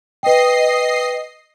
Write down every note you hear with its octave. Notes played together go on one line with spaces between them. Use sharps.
B4 D#5 G5 C7